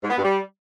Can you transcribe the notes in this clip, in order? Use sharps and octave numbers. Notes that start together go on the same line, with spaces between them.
G#2
B3
G2
G3